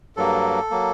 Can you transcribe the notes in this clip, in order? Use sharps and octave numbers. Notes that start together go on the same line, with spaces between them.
G2 F#3 A#3 A4
F#3 A#3